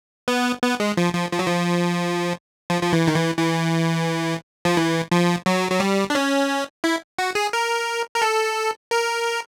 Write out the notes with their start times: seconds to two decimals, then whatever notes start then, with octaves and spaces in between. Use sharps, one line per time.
0.28 B3
0.62 B3
0.80 G#3
0.97 F3
1.14 F3
1.32 F3
1.39 F#3
1.46 F3
2.70 F3
2.82 F3
2.92 E3
3.07 D#3
3.15 E3
3.39 E3
4.65 F3
4.77 E3
5.12 F3
5.46 F#3
5.71 F#3
5.80 G3
6.10 D4
6.15 C#4
6.84 E4
7.18 F#4
7.35 G#4
7.53 A#4
8.16 A#4
8.22 A4
8.91 A#4